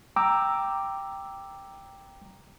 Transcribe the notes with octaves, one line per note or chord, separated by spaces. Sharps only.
G5 A#5 D6 E6